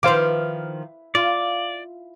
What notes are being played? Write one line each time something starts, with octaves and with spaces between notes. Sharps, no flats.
D#3 F3 E4 B4 C5 F5 D6
F4 D5